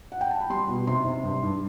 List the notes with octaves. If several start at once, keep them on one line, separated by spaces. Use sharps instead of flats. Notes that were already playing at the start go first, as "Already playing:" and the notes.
F#5
G5
A5
B5
G3 C6
B2
C3 C6
C3
G2
G2